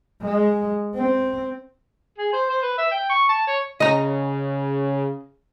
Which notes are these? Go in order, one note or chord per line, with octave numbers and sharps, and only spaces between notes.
G#3
C4
G#4
C5
C5
B4
E5
G5
C#6
A5
C#5
C#3 D#5 A#5